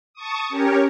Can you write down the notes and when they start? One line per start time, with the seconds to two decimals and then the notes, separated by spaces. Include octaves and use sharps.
0.14 A5 C#6 D#6
0.49 C#4 G4 A#4 C#5